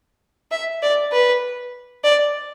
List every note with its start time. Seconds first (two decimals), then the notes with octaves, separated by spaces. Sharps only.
0.51 E5
0.82 D5
1.12 B4
2.04 D5